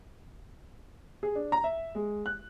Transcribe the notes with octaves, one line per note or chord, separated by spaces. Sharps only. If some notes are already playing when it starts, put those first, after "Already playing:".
G#4
D4
A#5
E5
G#3
F#6